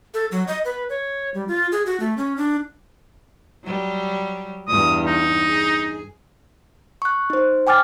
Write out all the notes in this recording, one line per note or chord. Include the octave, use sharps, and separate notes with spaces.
A4
F#3
D#5
B4
C#5
G3
F4
G#4
F#4
A3
C#4
D4
F#3 G3
E2 G2 D#6
D#4
G#4
C#6 F#6
D#4 C5
G5 G#5 D6 F6 A6